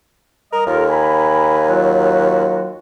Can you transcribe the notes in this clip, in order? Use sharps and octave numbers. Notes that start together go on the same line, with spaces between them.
G3 A#4 D#5
D#2 F4 A4 A#4
G#5 A#5 B5
F#3 F4 F#4